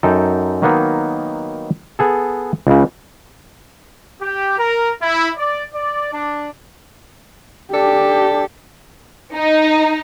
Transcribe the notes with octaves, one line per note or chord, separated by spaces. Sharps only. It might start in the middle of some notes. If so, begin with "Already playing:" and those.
F#2 D#4 A4 G5
D#3 F#3 A#3 B3 D#4
B3 G#4 A4
C#2 C#3
G4
A#4
E4
D5
D5
D4
D4 G4 A4
D#4